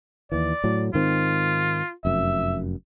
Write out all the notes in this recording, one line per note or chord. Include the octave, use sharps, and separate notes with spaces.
D#2 E3 D5
A2 F#3
G#2 D#3 C4 F4
F1 F#2 E5